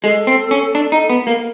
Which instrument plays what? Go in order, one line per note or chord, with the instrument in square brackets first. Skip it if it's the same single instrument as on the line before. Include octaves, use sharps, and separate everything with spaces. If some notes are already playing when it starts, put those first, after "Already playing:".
[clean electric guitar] G#3 [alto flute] A4
[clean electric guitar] C4
C#4
D4
D#4
B3
A#3